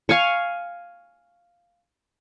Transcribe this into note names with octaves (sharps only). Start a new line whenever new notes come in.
F5 G#5 C#6